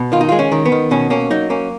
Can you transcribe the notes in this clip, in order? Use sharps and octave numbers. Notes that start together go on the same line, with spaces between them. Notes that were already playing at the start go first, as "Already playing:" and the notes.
Already playing: B2
D#3 F4
D#4
G#3 F4
C#4
D#3
B3
D#3
B2 C#4
A#3 C#4
F#3 D#4
A#3 C#4